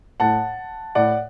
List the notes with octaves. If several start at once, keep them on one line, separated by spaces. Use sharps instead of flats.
A2 F#5 A5
A2 D5 F#5